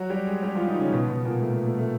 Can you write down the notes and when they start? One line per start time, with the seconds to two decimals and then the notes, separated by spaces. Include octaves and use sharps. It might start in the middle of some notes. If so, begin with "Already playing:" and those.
Already playing: F#3 F#4
0.10 G3 G4
0.26 G#3 G#4
0.43 G3 G4
0.55 F3 F4
0.67 D#3 D#4
0.80 C#3 C#4
0.92 B2 B3
1.08 B2 B3
1.25 A#2 A#3
1.42 A3
1.53 A3
1.66 A3
1.79 A3